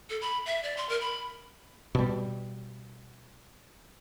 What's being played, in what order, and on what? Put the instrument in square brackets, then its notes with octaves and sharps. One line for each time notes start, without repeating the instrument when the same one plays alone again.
[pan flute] A4
B5
E5
D5
C6
A#4
B5
[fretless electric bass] B2 G3